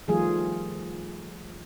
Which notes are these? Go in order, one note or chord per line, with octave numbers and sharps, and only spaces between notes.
D#3 F3 G3 A3 F4 G#4